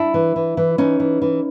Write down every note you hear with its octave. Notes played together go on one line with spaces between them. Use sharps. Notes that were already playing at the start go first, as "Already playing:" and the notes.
Already playing: D4 E4
E3
E3
E3
E3 C#4 D#4
E3
E3